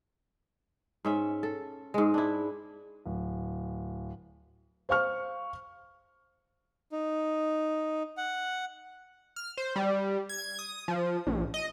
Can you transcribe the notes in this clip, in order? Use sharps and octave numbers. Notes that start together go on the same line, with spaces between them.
G#2 C#4 E5
A4
G#2 G#3
D4 E4
D1
C5 F5 C#6 F6
D#4
F#5
F6
C5
G3
G#6
D#6
F3
A#1
D#5